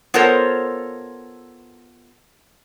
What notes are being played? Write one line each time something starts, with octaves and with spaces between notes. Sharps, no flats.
B3 F4 A4 A#4 C5 C#5